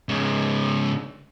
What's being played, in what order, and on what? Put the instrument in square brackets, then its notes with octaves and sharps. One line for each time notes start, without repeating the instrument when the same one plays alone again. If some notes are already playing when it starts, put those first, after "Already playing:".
[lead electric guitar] G#2 C#3